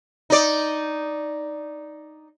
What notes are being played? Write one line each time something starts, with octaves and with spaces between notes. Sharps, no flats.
D#4 D5